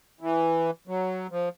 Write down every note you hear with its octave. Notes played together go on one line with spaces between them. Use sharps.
E3
F#3
F3